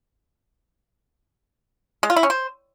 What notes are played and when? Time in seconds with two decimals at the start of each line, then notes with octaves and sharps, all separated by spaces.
2.03 G#3
2.10 F4
2.16 E4
2.23 C#4
2.30 C5